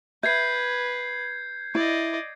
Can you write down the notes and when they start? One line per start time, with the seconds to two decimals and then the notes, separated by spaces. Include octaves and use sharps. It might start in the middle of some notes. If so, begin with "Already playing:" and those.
0.23 B4 E5 G6 G#6 C7
1.75 E4 D5 D#5